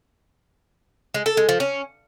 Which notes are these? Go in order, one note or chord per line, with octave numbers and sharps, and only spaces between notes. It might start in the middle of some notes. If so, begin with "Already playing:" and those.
G#3
A4
G#3
F3
C#4